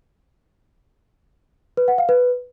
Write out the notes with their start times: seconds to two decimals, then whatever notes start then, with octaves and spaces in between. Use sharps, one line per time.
1.77 B4
1.88 F#5
1.98 F5
2.09 B4